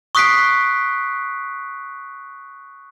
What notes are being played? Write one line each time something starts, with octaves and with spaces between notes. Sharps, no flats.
C#6 D#6 F#6 B6 C7 D7